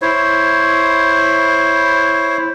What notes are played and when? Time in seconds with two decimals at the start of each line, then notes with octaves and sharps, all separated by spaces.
0.02 E4 C5 C#5